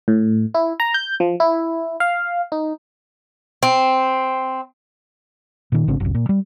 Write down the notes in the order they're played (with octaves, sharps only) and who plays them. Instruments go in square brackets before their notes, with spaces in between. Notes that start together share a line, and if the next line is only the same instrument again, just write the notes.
[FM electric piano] A2
E4
A#5
G6
F3
E4
F5
D#4
[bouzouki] C4
[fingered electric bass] A#2 D#3
G#1 C#3 C4 D4
F#1 C#2
A#2
G3